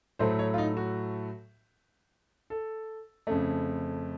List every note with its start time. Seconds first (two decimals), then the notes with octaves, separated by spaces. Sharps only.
0.19 A2 F#3 A3 C5
0.39 C#5
0.54 F4
0.58 D#4
0.77 F#4
2.50 A4
3.27 F2 C#3 A3